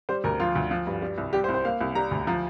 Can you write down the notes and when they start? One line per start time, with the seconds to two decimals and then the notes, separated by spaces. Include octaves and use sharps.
0.09 G3 C5
0.24 D2 A#4
0.40 F3 F4
0.55 D2
0.71 F3
0.87 G2
1.02 G3
1.18 C2
1.33 G3 G4
1.44 C5
1.48 C2
1.54 C5
1.65 A#3 F5
1.81 C2
1.95 G3 A#5
2.11 D2
2.27 F3 A#5